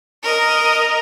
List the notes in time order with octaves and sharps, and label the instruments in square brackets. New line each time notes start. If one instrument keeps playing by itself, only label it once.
[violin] A#4 D#5